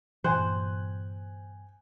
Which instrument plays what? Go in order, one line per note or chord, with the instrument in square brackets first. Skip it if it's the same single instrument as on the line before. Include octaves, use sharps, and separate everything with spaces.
[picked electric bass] G2 A#2 E3 [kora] C5 [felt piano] G5 G#5 F#6